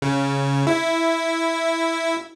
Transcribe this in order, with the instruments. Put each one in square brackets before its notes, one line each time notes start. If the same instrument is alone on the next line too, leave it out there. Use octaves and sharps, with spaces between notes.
[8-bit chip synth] C#3
E4